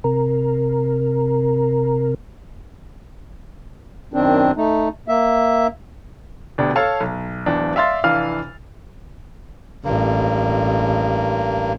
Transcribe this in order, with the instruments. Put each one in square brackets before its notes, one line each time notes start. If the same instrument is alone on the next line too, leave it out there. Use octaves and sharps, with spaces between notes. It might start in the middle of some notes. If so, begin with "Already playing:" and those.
[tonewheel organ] C3 A#4
[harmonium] F#2 D#3 C4 D4
A3 D#4
A#3 E5
[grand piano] D2 B2 D4 G4
A4 C#5 F5 A5
B1
D1 E2 D4
D5 E5 F5 C6 A6
F1 E3 D4 F5 F6
[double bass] A1 [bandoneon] G2 A#3